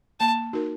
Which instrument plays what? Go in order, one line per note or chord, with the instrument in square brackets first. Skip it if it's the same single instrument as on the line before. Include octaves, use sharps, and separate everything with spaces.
[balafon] A#3 [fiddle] A5
[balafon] D#4 F#4 A#4